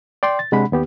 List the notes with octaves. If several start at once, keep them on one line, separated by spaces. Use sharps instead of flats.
D5 G5 C6
A6
C3 G#3 D4 F#5 B5
D#2 B3 G4